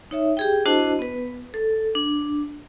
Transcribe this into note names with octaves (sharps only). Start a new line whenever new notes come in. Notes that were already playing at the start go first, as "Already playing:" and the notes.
D#4 C#5 E5
G4 G#4 G5
D4 E4 F#4 C5 D#5 A5
B3 B4
A4
D4